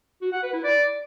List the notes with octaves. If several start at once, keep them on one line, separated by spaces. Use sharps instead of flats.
F#4
F#5
B4
E4
D5